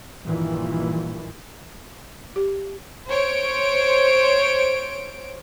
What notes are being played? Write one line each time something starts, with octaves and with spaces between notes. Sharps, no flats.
A#1 G2 A#2 D#3 E3
G4
C5 C#5 D7